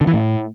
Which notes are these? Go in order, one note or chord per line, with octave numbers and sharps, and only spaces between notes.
D3
E3
A2